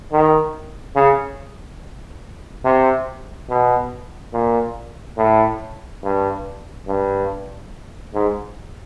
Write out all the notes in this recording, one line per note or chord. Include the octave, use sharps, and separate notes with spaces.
D#3
C#3
C3
B2
A#2
A2
G2
G2
G#2